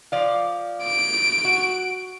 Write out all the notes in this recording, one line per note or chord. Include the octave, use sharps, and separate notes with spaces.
F3 D5 F5
D7
F#4